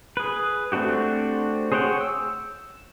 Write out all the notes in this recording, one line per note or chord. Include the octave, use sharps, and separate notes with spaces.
G#4 B4
A3 C4 D4 F#4 G4
G#4 C5 C#5 F#5 G5
E6